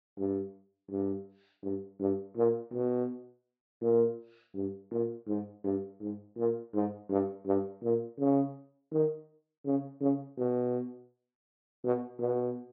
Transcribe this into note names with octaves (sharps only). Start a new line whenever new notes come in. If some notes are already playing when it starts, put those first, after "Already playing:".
G2
G2
G2
G2
A#2
B2
A#2
G2
A#2
G#2
G2
G#2
A#2
G#2
G2
G2
A#2
C#3
D#3
C#3
C#3
B2
B2
B2